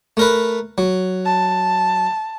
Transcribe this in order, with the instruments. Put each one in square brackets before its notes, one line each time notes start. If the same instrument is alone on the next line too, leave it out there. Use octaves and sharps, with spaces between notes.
[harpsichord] A3 A#4 B4
F#3
[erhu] A5